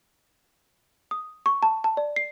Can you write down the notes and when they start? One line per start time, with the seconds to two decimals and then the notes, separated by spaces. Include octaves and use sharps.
1.11 D#6
1.46 C#6
1.63 A5
1.84 A5
1.97 D5
2.16 C7